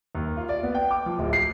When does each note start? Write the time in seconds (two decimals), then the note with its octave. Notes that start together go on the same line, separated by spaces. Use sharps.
0.15 D#2
0.37 F4
0.49 D5
0.63 B3
0.75 G5
0.91 D6
1.06 F3
1.19 D1
1.33 C7